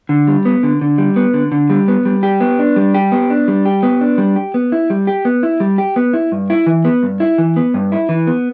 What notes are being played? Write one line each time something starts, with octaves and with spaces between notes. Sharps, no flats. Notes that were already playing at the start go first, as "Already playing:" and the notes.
D3
G3
B3
D3
D3
G3
B3
D3
D3
G3
B3
G3
G4
B3
D4
G3
G4
B3
D4
G3
G4
B3
D4
G3
G4
B3
E4
G3
G4
B3
E4
G3
G4
B3
E4
G2
E4
E3
B3
G2
E4
E3
B3
G2
E4
E3
B3